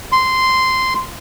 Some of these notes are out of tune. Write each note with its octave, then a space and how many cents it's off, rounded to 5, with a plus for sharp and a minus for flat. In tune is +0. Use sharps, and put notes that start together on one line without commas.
C6 -10